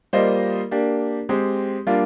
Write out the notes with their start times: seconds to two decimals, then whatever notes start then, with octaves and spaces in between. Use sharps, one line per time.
0.13 G3 A#3 F4 C5 D#5
0.71 A#3 D4 G4
1.29 G#3 C4 G4
1.87 G3 A#3 D4 F4